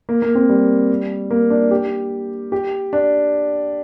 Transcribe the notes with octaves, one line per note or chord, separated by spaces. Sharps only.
A#3
A#3
C4
G3
A#3
D4
G4
G4
D4